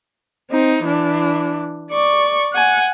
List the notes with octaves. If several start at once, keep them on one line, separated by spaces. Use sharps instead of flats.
C4 D#4
E3 D4
D5 C#6
F#5 G#5